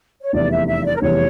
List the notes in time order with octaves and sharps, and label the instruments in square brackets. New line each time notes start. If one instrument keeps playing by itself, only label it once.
[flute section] C#5
[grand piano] F1 E2 E3 G3 [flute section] D5
[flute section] E5
E5
D5
A#4
[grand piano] F1 E2 E3 G3 [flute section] C#5